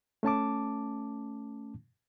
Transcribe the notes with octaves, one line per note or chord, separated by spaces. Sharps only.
A3 C#4 A5 D6